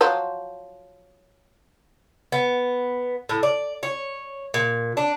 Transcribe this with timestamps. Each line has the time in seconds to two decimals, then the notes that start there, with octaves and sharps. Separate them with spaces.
0.01 F3 F#3 C5
2.32 B3
3.29 A2
3.43 D5
3.83 C#5
4.54 A#2
4.97 D4